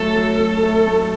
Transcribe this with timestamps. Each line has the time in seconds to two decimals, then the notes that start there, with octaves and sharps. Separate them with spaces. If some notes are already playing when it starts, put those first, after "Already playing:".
Already playing: F#3 A3 A4
0.16 F#3
0.40 F#3
0.63 A3
0.87 A3